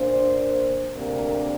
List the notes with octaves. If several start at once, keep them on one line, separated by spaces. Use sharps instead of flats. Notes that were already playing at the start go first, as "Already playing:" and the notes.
Already playing: A#2 A#3 D4 C5
D2 C3 A#3 D4 A#4